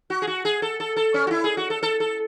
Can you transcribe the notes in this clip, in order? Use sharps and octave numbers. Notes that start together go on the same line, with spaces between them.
F#4
G#4
F#4
G#4
A4
A4
A4
C#4
F#4
E4
G#4
F#4
A4
A4
A4